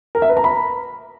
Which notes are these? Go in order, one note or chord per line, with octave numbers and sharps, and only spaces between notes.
A#4
E5
B4
A#5
B5